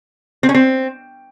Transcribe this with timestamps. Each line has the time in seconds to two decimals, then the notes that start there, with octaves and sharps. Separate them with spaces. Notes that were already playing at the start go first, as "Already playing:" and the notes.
0.43 C4
0.49 C#4
0.54 C4